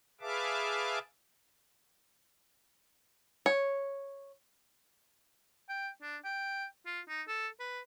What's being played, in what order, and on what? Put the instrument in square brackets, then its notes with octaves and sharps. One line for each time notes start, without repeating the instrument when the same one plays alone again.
[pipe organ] G#4 B4 E5 F5 A5 D6
[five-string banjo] C#5
[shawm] G5
D4
G5
F4
D#4
A4
B4